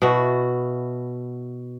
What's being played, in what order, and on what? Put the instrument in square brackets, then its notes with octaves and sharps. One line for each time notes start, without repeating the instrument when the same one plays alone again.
[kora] B2 E4 F#4